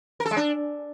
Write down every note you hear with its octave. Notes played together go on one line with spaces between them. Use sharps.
A#4
A4
G#3
D4